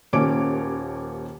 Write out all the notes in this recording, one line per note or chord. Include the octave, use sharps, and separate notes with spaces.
D#1 D#2 C#4 C#5 D6 D7